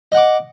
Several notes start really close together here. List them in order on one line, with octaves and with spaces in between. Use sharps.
D#5 F#5 D6